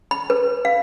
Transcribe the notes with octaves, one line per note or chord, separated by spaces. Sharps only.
B5
B4
F5